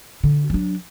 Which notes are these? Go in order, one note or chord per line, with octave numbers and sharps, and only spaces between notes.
D3
F#3 D4